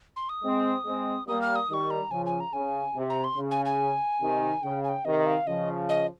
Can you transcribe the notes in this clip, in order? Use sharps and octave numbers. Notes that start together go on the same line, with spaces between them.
C6
D#6
G#3 C4
G#3 C4
G3 A#3 D#6
F6
D#6
D#3 G3 C#6 D#6
A#5
C#3 F3 G#5
G#5
A#5
C#3 G#5
C3
A#5
C6
C#3
G#5
G#5
C3 D#3
C#3 G5
G#5
G5
C3 D#3 D#5
F5
C#3 F3 D#5
D#5